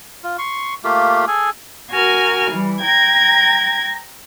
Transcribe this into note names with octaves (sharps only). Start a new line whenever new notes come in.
F4
C6 C#6
A3 A#3 F4 G4
G#4 A4 G#5
F#4 A#4 G#5 F6
E3 G3
G5 A#5 G#6 A#6